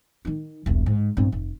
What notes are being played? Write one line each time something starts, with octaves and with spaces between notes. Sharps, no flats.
D#3 D#4
E1 C2
G#2
G2 C4
F1